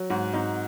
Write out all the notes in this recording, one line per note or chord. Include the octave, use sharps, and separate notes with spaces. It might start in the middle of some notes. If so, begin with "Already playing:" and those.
Already playing: F#3
G#2 F#4
G#2 D#4